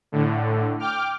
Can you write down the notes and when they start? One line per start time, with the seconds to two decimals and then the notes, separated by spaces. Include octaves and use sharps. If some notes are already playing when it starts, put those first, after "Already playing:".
0.12 A2 D3
0.79 G5 D6 F6